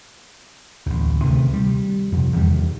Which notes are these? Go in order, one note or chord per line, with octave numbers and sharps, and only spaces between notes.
A1 D2
C3 D#3 A3
G3
F2 C3
E2 D#3 G3